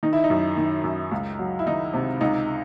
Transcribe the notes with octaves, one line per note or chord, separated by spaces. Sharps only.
D#3 D#4
E4
D#4
F#2
D#3
F#2
C#2
F#3
E4
D#3 D#4
C3
C#2 D#4